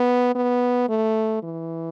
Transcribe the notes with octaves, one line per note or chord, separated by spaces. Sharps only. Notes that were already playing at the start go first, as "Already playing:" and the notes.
Already playing: B3
B3
A3
E3